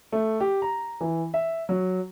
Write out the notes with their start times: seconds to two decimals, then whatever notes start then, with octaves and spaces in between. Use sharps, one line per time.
0.12 A3
0.40 G4
0.62 A#5
1.01 E3
1.34 E5
1.69 F#3